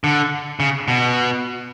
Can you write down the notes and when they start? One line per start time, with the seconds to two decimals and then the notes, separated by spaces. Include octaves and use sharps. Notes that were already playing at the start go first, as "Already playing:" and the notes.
0.04 D3
0.60 C#3
0.88 B2